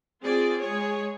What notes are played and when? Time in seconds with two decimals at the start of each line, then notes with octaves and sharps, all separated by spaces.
0.21 C4 F4 G#4 D5
0.61 G#3 G#4 C#5